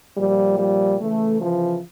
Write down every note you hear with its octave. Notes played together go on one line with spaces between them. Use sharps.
A#2 F3 G3
G3
C#3 E3 A3
F3